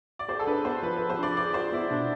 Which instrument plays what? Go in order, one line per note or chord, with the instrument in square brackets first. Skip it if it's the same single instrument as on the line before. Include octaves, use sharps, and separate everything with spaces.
[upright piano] D5
[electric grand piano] G#4 [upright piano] C5
[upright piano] A4
[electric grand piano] D4 [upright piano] B4
[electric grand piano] B3 [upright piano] C5
[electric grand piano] F3 [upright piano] B4
[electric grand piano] G#4 [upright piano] B4
[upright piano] C5
[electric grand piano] D4 [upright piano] D5
[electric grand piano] G#4 [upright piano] D5
[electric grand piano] F4 [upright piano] C5
[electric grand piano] B3 [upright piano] E4
[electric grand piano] B2 [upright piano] D4